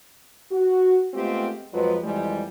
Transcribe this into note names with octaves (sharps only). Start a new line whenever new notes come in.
F#4
G#3 A3 B3 C4 F4 G4
F2 F3 F#3 G#3 B4
F2 E3 G3 G#3